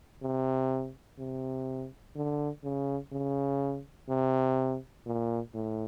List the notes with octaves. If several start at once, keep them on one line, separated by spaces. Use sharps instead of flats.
C3
C3
D3
C#3
C#3
C3
A#2
A2